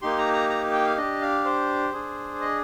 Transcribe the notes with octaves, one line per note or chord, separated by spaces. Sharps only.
A#3 D#4 G4 C6
A#5
A#5
A#5
G5
F5
D4 G4 D#5
F5
C5
D4 G#4
D#5